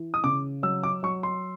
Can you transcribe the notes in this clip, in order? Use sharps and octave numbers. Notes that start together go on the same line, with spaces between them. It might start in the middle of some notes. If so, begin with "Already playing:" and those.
Already playing: E3
D#6
C#3 D6
F#3 E6
D6
F#3 C#6
C6